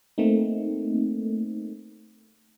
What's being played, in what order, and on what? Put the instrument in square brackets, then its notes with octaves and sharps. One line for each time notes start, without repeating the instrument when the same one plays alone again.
[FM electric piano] A3 A#3 C4 D#4